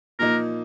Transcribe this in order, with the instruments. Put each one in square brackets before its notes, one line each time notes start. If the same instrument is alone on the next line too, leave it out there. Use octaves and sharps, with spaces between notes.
[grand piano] A#2 F3 A#3 D#4 [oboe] A#4